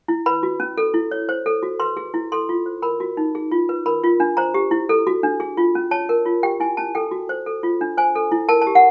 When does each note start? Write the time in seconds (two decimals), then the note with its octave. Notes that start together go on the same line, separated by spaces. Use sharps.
0.08 E4
0.26 B4 B5
0.43 F#4
0.60 C#4
0.78 A4
0.94 E4
1.11 C#5
1.29 C5
1.46 A4
1.63 F#4
1.80 B4 C6
1.97 G#4
2.14 E4
2.32 A4 C6
2.49 F4
2.66 C5
2.82 A#4 B5
3.00 F#4
3.17 D#4
3.35 G#4
3.52 F4
3.69 B4
3.86 A#4 B5
4.04 F4
4.20 D4
4.37 C5 A#5
4.54 G4
4.71 E4
4.89 A4
5.07 F#4
5.23 D4
5.40 G#4
5.57 F4
5.75 C#4
5.91 C#5 A5
6.09 A#4
6.26 F4
6.43 G4 G5
6.60 E4 G#5
6.77 C#4 A5
6.95 A4 G5
7.11 F#4
7.29 C5
7.46 A4
7.63 F4
7.81 D4
7.97 C5 G#5
8.15 A4
8.32 E4
8.49 A#4 A5
8.62 A5
8.67 G4
8.75 F#5